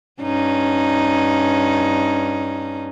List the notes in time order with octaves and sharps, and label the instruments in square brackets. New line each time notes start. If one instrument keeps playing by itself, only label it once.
[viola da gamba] G2 C#4 D#4